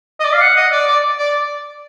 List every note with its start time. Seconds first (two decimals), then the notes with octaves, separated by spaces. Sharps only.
0.20 D#5
0.25 D5
0.33 F5
0.40 F#5
0.56 D#5
0.72 D5
0.87 D5
1.18 D5